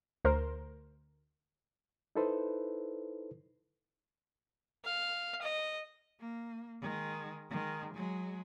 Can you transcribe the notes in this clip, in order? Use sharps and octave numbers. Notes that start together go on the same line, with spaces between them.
D2 A#4 C5
D#4 E4 A4 B4 C5
F5
D#5
A#3
D#3 G#3
D#3 G#3
F#3 G#3